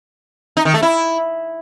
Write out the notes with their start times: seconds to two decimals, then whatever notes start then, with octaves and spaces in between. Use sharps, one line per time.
0.57 D#4
0.65 D#3
0.74 A3
0.83 E4